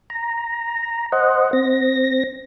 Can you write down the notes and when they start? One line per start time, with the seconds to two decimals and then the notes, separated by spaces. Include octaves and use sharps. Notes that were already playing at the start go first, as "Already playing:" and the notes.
0.10 A#5
1.12 C5 D#5 F#5
1.53 C4 A#6